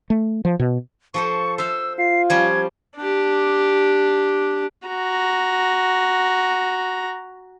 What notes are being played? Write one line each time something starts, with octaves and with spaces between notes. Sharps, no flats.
A3
F3
B2
F3 A4 C5 C#6
C5 E5 F5 E6
F4 C7
F3 G3 C#4 G#6
D4 G4
F#4 A#5